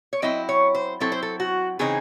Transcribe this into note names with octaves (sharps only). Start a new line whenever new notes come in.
C#5
F#3 C4 E4 D#5
C#5
C5
F#3 C4 E4 A4
C5
A4
F#4
C#3 E3 C4 D#4 G#4